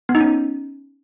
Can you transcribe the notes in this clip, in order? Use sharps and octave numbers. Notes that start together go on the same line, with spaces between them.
B3
D#4
C#4